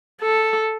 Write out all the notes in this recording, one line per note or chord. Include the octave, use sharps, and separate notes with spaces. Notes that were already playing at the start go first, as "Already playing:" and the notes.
A4